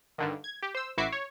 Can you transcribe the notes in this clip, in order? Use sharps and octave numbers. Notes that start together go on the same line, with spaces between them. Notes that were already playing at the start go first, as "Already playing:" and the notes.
G2 D3 D#3
G#6
G4
C5 E6
A1 E4 F#4 E5 D6 C7
C#5